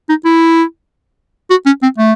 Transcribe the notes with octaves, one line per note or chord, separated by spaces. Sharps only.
D#4
E4
F#4
C#4
C4
A3